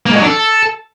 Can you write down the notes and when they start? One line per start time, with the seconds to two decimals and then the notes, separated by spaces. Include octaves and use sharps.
0.06 A#3
0.11 G#3
0.16 F#3
0.21 D4
0.27 A4